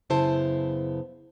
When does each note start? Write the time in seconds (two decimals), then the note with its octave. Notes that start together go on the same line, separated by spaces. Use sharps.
0.10 F#2 C#3 B3 E4 C5 A5